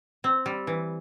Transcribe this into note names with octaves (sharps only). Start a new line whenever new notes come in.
C4
G3
E3